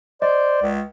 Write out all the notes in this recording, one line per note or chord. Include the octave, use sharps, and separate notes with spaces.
C5 D5 D#5
C#2